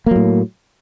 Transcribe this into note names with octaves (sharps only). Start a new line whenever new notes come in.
A2 F#3 A#3